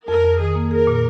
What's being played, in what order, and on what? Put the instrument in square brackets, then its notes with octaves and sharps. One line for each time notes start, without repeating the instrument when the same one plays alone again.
[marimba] F2 [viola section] A#4
[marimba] F2
[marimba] D#3 [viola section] G#4
[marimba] A#3
[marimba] G#4 [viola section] A#4
[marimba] A#2